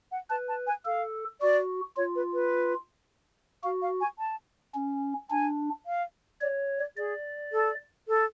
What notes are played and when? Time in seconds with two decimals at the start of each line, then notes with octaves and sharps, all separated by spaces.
0.12 F#5
0.30 B4 A5
0.48 A5
0.67 G#5
0.85 A4 F5
1.41 F#4 D5
1.97 F4 C#5
2.16 B4
2.34 B4
3.63 F#4 F5
3.82 F5
4.01 G#5
4.19 A5
4.74 C#4
5.30 D4 G#5
5.86 F5
6.41 C#5 D5
6.78 D5
6.97 G#4 D5
7.52 A4
8.08 A4